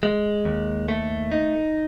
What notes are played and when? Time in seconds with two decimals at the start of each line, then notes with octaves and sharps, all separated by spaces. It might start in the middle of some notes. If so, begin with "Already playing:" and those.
0.03 G#3
0.45 D#2
0.88 A3
1.32 D#4